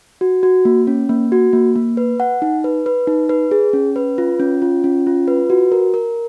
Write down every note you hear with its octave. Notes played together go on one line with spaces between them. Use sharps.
F#4
F#4
A#3
C#4
A#3
F#4
A#3
A#3
B4
F#5
D#4
B4
B4
D#4
B4
G#4
C#4
B4
F4
C#4
F4
C#4
F4
B4
F#4
A#4
A#4